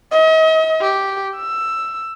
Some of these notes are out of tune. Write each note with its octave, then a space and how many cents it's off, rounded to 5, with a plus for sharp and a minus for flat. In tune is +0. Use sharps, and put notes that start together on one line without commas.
D#5 +40
G4 -5
E6 +10